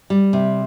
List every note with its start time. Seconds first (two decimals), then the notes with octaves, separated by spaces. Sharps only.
0.10 G3
0.33 C3